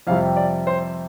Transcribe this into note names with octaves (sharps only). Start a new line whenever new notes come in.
F2 C3 G3 F5
D5
C5